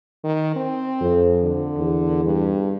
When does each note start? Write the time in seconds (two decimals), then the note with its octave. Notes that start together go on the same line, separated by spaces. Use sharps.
0.24 D#3
0.56 C4
1.01 F2
1.43 D3
1.78 E2
2.25 G2